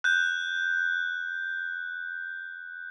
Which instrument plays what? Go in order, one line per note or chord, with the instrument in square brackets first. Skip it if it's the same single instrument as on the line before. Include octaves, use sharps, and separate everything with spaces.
[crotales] F#6 G6